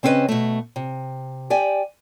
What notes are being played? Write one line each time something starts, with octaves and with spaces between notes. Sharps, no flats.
C#3 C4 C#4 G4 B4 D#5
B2 A3
C3
G4 D5 G5 G#5